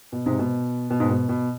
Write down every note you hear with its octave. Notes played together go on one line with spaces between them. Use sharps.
B2
G#2 C3
B2
B2
G#2
B2
B2